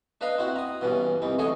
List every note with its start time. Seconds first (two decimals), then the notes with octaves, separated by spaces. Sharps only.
0.21 D4 B4 D#5 F5 A#5
0.38 C4 E4 F#4
0.56 A#5 D#6
0.81 G2 B2 E3 C#4
1.22 C2 E3 D#4
1.39 D3 A3 G#4 C#5 D#5 G#5